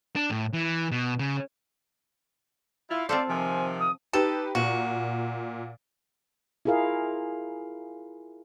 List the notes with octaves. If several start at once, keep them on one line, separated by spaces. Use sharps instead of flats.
D4
A2
E3
B2
C#3
E4 F4 F5
C4 F4 A4 C5 D5
C3 D#3 F3 G#5
D#6
D#4 G4 A4 B4
A#2 F#4
E4 F4 G#4 A#4 F5